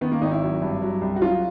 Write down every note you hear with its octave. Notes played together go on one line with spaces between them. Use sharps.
D#3 B3
A#3
G#1 D#4
E4
F#3
G2
F#3
C2
F#4
F#3 F4